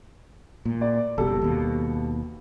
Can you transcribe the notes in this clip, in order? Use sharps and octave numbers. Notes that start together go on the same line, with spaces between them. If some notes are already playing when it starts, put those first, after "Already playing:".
A#2
D5
F#1 B2 G3 A4
D#2 B2